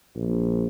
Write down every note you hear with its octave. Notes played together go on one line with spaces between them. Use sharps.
A#1